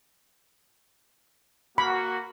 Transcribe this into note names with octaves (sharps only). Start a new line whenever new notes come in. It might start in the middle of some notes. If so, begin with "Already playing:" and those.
A#3 F#4 B5